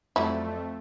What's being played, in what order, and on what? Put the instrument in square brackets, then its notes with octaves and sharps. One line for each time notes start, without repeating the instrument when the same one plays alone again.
[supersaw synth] F2 A3 [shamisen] F#3 G3 E4